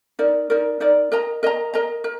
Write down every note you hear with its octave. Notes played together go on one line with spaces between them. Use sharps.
D#4 A#4 D5
D#4 A#4 D5
D#4 A#4 D5
A#4 D#5 A#5
A#4 D#5 A#5
A#4 D#5 A#5
A#4